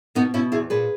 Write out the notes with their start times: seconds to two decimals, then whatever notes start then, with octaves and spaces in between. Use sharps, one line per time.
0.15 B2 B3 D#4
0.34 B2 C#4 E4
0.52 E2 E4 G#4
0.70 A#2 G#4 B4